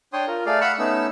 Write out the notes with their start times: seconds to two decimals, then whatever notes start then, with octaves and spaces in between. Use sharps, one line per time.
0.13 D4 C#5 G5 C6 D#6
0.27 F4 A#4
0.46 A3 G#4 D5 F5
0.61 F5 F#5 B5 C#6 E6 F#6
0.79 A3 B3 C#4 D#4 E6